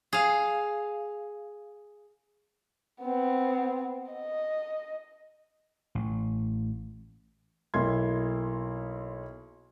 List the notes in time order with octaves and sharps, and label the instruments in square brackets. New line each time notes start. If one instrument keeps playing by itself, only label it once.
[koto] G#4 F5
[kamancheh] B3 C4
D#5
[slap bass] A1
[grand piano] B1 A#3 E4 C6 G#6